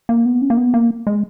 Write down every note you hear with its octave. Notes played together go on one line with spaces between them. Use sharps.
A#3
B3
C#4
A#3
B3
A#3
G#3